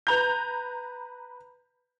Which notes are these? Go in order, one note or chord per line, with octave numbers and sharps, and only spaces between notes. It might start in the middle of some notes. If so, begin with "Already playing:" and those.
B4 A#5 G6